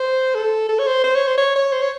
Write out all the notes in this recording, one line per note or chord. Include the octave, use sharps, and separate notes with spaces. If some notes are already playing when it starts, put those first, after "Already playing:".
Already playing: C5
A4
A4
C#5
C5
C5
C#5
C5
C#5
C#5
C5
C#5